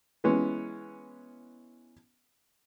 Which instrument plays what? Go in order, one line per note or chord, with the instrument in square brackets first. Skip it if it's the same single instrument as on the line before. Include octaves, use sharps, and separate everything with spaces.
[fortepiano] E3 G#3 B3 C#4